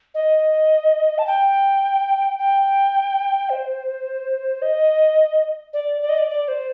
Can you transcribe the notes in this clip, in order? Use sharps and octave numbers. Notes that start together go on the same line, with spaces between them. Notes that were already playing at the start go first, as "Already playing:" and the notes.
D#5
A5
G5
G5
C5
D#5
D5
D5
D#5
D5
D5
C5